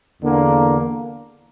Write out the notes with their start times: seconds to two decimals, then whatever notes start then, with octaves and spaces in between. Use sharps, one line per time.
0.21 E2 D3 A#3